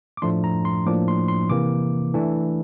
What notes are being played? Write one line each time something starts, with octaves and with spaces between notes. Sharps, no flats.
D6
A2 F3 A3 D4 C6
A#5
C6
A2 F3 A#3 D4 D6
C6
C6
C3 E3 A#3 D6
E3 A3 D4